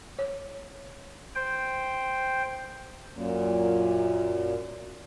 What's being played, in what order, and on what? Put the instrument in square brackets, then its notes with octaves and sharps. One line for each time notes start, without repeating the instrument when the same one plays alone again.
[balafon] C#5
[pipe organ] C5 G5
[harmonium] F#2 A#2